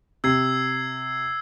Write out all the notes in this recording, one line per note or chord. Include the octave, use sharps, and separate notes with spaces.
C3 E6 G#6 C7